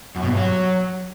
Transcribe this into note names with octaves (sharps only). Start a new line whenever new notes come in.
F#2
B2
G2
F#3